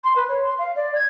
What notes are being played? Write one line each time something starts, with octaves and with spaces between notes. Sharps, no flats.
C6
B4
C#5
C6
F5
D5
G#6